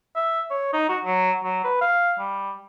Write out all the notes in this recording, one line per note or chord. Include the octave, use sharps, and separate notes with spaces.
E5
C#5
D#4
F#4
F#3
F#3
B4
F5
G3